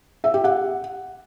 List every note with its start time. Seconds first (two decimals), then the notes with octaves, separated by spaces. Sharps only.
0.24 E5
0.34 G4
0.44 F#5